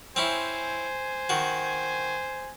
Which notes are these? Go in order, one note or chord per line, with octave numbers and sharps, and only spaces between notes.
C4 C#4 E4 C5 G#5
D#3 F#4